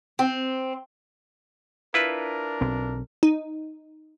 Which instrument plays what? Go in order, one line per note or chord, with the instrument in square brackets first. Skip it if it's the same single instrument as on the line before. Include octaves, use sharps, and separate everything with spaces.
[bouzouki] C4
[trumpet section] D4 A#4 [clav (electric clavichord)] E4 F4 B4
[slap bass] B1 C4
[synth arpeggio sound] D#4